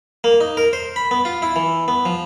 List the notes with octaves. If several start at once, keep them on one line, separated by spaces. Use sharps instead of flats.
A#3
D#4
A#4
C5
B5
B3
F4
E4
E3
B3
F3